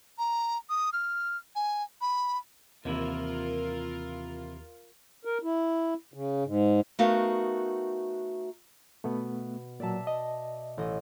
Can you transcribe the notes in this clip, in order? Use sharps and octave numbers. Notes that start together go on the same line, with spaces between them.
A#5
D#6
F6
G#5
B5
D#2 C3 E3 E4 F4 A#4
A#4
E4
C#3
G#2
A3 B3 D#4 F#4 A#4 F5
B2 A3 B3
A#2 F#3 D5 E5 A5
D#5
A1 D#5